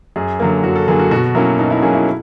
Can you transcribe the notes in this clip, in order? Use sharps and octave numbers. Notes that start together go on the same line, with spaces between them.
F#2 G#4
D3 F#3 A#3
F#2 F#4
A4
D3 F#3 A#3 G#4
F#4
B2 F#4
F#3 A#3 C#4 E4
B2 D#4
E4
F#3 A#3 C#4 G#4
E4